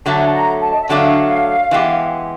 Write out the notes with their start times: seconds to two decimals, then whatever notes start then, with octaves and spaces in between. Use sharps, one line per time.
0.06 D3 F#3 A3 D4 A5
0.18 G#5
0.26 A5
0.34 A#5
0.61 A5
0.72 D#5
0.80 E5
0.89 D3 F#3 A3 D4 F5
1.71 E3 G#3 B3 E4 G4